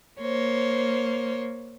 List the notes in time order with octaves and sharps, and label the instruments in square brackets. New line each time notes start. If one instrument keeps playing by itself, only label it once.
[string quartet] A#3 C5 C#5